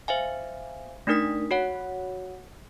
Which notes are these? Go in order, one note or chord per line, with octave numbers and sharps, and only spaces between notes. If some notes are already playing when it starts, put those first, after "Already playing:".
C5 E5 F5 G#5
A3 D4 D#4 A#4 D#6 B6
F#4 C#5 F#5